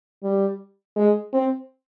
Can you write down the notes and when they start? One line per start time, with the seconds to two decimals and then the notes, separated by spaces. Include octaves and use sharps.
0.23 G3
0.96 G#3
1.34 C4